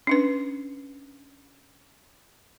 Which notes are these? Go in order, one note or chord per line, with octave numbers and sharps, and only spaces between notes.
C#4 D4 B4